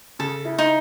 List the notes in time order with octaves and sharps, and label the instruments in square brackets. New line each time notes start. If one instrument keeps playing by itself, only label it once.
[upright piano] C#3 [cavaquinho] A4
[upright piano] E4
[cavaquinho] D#4